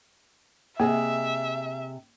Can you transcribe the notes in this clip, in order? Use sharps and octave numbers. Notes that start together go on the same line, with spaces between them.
C3 A#3 G#4 D#5 E5